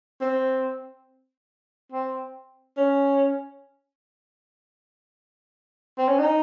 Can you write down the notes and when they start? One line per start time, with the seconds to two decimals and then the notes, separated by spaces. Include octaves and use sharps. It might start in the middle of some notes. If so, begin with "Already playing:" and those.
0.21 C4
1.92 C4
2.77 C#4
5.98 C4
6.08 C#4
6.19 D#4